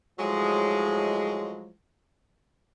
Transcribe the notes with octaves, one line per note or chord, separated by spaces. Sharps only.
A2 F3 F#3 G#3